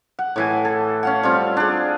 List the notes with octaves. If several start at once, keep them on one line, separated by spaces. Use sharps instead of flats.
F#5
A2 E3 G#5
A4
C#4 F5 F#5
G3 C4 F4
D4 G#4